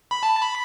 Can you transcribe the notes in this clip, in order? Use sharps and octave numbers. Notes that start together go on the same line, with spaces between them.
B5
A5
B5